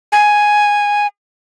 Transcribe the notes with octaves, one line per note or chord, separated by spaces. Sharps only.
G#5